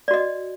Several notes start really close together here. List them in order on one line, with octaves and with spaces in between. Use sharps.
D5 F#4 D#5